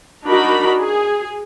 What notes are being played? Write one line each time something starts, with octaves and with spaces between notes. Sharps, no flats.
D4 D#4 F#4 A#4 B5
G#4